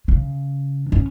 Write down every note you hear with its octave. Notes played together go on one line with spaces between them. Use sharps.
C#3
C#4